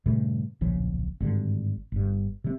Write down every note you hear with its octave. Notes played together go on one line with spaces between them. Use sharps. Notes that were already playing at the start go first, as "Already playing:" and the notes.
G2 A#2 C#3 A3
D1 A#1 C#3 F3
G#1 G2 D3
G1 G2
C3 G#3 C4